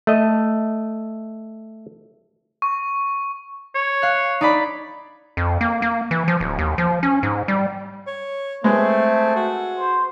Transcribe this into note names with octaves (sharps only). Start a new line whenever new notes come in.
A3 D#5
C#6
C#5
F5 F#6
D#4 D5 B5
F2
A#3
A#3
E3
F3
D1
D#2
F3
C#4
G#2
G3
C#5
G#3 A3 C4 B4
F#4
C5